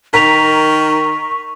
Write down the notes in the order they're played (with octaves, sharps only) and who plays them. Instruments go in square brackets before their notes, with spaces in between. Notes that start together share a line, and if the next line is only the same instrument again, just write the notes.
[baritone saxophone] D#3 [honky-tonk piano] A#4 [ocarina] C#6 [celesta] B6 F7